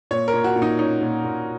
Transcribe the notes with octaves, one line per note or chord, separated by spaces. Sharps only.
A#2 C#5
A#4
A#2
F#4
A#2
D#4
C#4 D#4
A#2
A#2